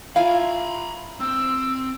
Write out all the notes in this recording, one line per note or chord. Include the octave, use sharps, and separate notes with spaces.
E4 F4 F5 G#5 A#5 B5
C4 E6